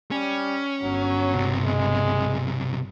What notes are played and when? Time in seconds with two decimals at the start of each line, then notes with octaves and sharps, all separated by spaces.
0.11 G3 C#4
0.81 G1 F#3
1.34 B1 C3
1.66 G#3